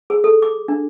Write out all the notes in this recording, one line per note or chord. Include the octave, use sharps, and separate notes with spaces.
G#4
A4
D6
D4